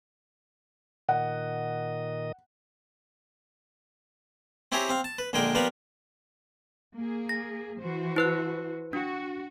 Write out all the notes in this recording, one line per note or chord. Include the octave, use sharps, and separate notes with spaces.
A#2 D#3 D#5 F#5
C4 E4 G4 G#4 C#5 A#5
C4 F5
A5
B4
A#1 D3 G#3 G#4 A#4 G5
F3 G3 B3 A#4 B4 F5
A#3 G#4
A#6
E3 F#4 C5
E4 B4 F#6
D4 F#4